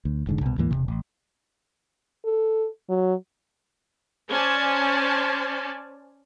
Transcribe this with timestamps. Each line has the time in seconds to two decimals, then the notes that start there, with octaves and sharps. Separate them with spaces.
0.05 D2
0.27 F1 G#2 D3
0.41 C2 B2
0.58 D2 G#2 E3 A#3
0.71 E1 F2 C3
0.88 A1
2.25 A4
2.89 F#3
4.30 C#4 C5 D5 G#5 A5